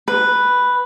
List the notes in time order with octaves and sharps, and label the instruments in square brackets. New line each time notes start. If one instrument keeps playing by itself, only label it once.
[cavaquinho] B4